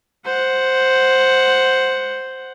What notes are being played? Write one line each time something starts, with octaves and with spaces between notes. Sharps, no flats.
C5 F#5